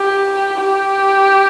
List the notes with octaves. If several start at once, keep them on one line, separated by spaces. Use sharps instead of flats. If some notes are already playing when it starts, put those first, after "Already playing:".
Already playing: G4
G4